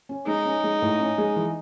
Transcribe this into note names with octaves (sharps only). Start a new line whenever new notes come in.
C#4
G#3 D#4
C#4
G#3
A2
C#4
G#3
E3